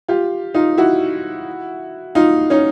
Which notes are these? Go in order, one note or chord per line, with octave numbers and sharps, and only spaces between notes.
F4 G4
D#4 F4
E4 F#4
D#4 F4
C#4 D#4